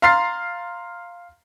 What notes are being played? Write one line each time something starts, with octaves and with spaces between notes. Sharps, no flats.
F5 A#5 C6 F6 A6 C7